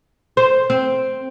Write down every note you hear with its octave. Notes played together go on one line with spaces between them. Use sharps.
C5
C4